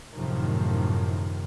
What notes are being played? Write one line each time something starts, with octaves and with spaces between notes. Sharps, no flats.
F#2 A2 C3 D#3 F3